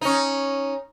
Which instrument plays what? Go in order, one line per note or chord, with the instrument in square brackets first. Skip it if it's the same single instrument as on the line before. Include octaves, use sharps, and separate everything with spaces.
[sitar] C#4 D#4